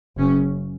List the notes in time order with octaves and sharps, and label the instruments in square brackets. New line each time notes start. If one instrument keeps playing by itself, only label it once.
[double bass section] F#1 F#2 C#3 C#4